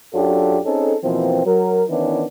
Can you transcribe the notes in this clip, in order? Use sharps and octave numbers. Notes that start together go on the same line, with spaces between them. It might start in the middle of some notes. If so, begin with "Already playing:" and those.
F#2 F#3 D4 F4 G4 A4
C4 C#4 D#4 G#4 A4
B2 E3 F3 A#3 C4
F#3 A#4
D#3 E3 B3 C#4 D4 E4